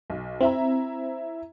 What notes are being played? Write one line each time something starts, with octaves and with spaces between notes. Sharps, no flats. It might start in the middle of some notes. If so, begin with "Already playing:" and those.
B1
C4 E4 E5 A#5